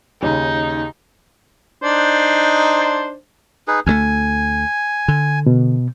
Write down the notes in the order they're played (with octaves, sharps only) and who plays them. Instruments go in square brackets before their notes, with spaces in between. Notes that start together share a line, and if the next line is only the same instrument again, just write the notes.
[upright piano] D#2 C#3 [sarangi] D#4
[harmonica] D4 D#4 C5
[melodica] D#4 G#4 B4
[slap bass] D2 G3 A3 [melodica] G#5
[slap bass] D3
[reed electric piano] B2